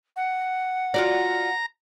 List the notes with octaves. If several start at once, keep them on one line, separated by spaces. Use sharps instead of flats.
F#5
F4 F#4 D5 A#5